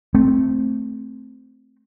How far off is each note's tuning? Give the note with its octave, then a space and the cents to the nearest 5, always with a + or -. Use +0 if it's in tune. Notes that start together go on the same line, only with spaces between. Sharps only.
A3 +0 C4 +0